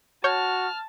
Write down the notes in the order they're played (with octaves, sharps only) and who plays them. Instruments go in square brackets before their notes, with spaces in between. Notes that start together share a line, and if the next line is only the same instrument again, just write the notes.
[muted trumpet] F#4 [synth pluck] C#5 G6 [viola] A5 [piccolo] F6